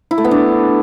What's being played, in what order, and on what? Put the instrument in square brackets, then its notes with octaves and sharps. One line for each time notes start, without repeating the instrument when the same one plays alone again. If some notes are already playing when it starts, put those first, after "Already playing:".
[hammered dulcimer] E4
A3
B3
D4